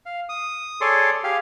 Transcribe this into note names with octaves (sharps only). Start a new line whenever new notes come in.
F5
D#6
G#4 A4 C#5 D5 C6
G4 G#4 F5